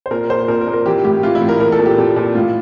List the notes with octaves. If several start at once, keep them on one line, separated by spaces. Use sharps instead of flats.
C5
A#2 A#4
A#2 C5
A#2 A#4
A#4
A#2
A#4
E3 G4
A2 G4
E3 F4
E4
A2
A#4
A#2 A#4
A4
A#2
G4
A#2
A#2
A2 F4